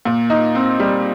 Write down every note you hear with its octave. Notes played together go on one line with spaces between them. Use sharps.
A#2
D#4
C4
G3